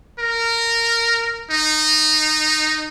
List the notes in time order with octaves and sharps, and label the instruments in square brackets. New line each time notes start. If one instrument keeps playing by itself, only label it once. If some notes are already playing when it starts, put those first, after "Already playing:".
[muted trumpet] A#4
D#4